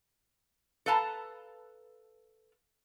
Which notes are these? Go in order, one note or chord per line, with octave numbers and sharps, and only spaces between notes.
A4 B4 F5 A5 A#5